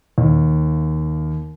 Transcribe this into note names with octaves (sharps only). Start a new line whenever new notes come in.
D#2